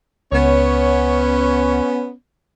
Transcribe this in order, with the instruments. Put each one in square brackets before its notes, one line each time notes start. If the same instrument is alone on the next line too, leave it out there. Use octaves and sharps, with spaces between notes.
[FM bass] C#2 [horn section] B3 C#4 [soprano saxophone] C#5